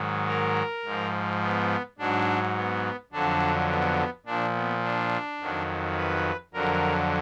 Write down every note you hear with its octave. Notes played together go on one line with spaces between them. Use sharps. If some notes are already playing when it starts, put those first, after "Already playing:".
Already playing: G#2 D#3 F#3
A#4
G#2 F3
B3
G#2 F#3 D4
B3
F2 D3 F#3 D4
B3
A#2 F3 D4
B3
D4
F2 D#3 F#3
B4
F2 D3 F#3 A#4